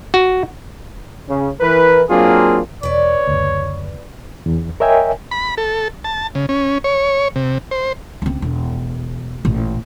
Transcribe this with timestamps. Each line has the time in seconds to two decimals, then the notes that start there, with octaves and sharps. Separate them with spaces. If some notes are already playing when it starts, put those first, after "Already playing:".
0.14 F#4
1.29 C#3
1.61 E3 A#4 B4
2.09 F#3 A#3 C4 D4 F4 G#4
2.83 E1 B4 C#5 D5
3.27 F#1 D2
4.46 E2
4.80 A#4 C#5 D#5 E5 G5 G#5
5.31 B5
5.58 A4
6.04 A5
6.35 C#3
6.49 C#4
6.84 C#5
7.36 C3
7.71 C5
8.22 C#2 C4
8.42 E1
9.45 A1 A#2